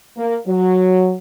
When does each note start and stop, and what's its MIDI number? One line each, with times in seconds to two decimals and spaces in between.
0.17 0.39 58
0.47 1.15 54